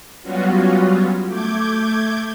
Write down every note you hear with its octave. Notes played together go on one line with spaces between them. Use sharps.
F#3 G3 B3 C#4 F4 F#4
A3 D6 G6 G#6